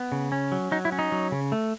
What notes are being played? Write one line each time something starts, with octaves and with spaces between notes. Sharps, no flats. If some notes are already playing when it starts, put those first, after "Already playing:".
Already playing: B3
C#3
C#4
F#3
F#3 D#4
E4
C#4
D#4
F#3
C#3
A3